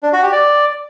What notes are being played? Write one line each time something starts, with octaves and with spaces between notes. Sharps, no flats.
D4
F#4
G4
D5